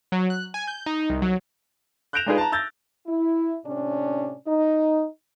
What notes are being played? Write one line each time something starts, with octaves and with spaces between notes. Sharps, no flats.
F#3
F#6
G#5
G6
D#4
C2
F#3
F#6 G6 A#6 D7 E7 F7
G#3 D4 D#4 F4 G#4 B4
A5 A#5
E6 G6 A6 A#6
E4
A2 C3 C#4 D4
D#4